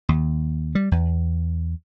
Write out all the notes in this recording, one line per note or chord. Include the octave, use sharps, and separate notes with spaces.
D#2
G3
E2